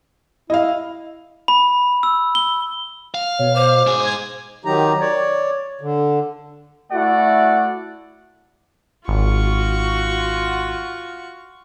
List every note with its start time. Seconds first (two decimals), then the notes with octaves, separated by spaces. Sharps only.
0.50 E4 D#5 F5
1.48 B5
2.03 E6
2.35 G7
3.15 F5
3.39 B2 C#5
3.56 C5 D6
3.87 G#2 G#4
3.99 G#6
4.65 D#3 F#3 D#4 G4 A#5
5.00 C#5 D5
5.81 D3
6.93 A3 E4 F#4 D5 F#5
9.08 G#1 F4 F#4 C#6